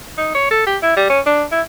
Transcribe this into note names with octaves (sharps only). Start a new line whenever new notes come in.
D#4
C#5
A4
G4
E4
G3
C#4
D4
E4